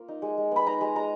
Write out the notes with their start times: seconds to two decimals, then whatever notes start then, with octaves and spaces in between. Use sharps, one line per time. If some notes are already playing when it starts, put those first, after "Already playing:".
Already playing: A#3 F4
0.08 D#4
0.22 G#3
0.37 G#3
0.51 B3 B5
0.66 D#4 A#5
0.81 G#3
0.95 G#3 A#5